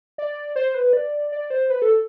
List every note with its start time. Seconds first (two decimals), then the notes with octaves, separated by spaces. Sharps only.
0.18 D5
0.56 C5
0.75 B4
0.93 D5
1.32 D5
1.50 C5
1.70 B4
1.82 A4